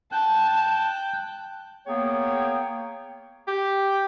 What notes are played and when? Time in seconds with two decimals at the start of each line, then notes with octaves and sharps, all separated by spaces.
0.12 G5 A5 F#6
1.87 A#3 B3 G#4 C#5 G5
3.48 G4